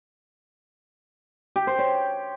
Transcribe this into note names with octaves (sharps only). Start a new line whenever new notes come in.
G4
C5
C#5